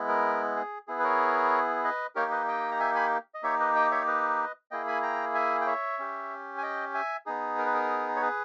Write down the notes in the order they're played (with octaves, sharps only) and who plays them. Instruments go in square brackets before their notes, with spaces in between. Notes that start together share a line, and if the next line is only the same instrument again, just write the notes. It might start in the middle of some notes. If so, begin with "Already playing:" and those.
Already playing: [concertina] G#3 B3 E4
A#4
G#4
B3 E4 G#4
B4
A#4 C#5
B4 D#5
A#3 D#4 G4 A#4 C#5
B4 D#5
D#5 G5
A#5
E5 G#5
G#5 B5
D#5
A#3 D#4 G4 C#5 E5
B4 D#5
D#5 G5
C#5 E5
B4 D#5
A#3 E4 G#4 D#5 G5
G#5 B5
G5 A#5
E5 G#5
G5
C#5 E5
C#4 G4
G#5
D#5 G5
E5 G#5
B3 D#4 G#4
A#4
B4
A#4
C#5
G#4 B4